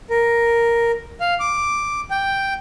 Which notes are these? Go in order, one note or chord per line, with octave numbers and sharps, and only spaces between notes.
A#4
F5
D6
G5